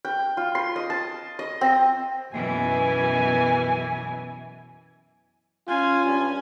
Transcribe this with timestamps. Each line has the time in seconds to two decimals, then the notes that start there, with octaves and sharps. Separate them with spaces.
0.05 G5
0.37 F4
0.55 C6
0.76 D#5
0.90 A5
1.39 D#5
1.61 C4
2.36 F#2 B2 E3 G#5
5.68 C#4 F4 G#5
6.05 G2